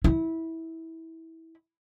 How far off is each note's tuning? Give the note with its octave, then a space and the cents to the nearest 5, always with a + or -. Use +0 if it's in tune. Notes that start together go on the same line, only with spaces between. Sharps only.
E4 -20